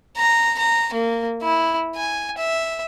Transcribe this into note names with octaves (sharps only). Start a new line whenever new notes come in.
A#5
A#5
A#3
E4
G#5
E5